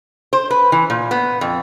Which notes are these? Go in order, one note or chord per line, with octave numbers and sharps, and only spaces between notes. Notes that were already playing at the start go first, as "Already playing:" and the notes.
C5
B4
E3
A#2
B3
F2